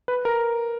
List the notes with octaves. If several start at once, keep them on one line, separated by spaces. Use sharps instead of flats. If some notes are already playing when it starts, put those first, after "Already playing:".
B4
A#4